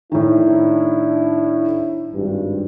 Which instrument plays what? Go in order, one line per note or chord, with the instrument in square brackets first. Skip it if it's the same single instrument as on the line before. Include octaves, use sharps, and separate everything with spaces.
[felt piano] A2 D#3 [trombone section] D4 E4
[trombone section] G#1 G2